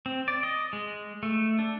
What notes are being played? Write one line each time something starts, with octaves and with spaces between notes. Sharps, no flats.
C4
D5
D#5
G#3
A3
D4